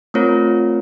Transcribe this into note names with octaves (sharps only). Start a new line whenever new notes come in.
A3 C4 F4 A#4 C#5